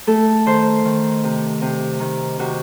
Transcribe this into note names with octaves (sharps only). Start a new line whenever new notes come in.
A3 A4
D#3 C5
D#3
C3
C3
D#3
C3 F#4